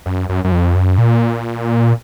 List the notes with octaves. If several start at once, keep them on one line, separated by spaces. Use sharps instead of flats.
F#2
F#2
F#2
F2
F#2
A#2